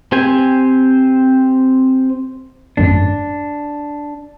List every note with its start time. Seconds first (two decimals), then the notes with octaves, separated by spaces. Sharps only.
0.12 C4 G4 C5 G#5
2.77 G#1 F#2 A2 D4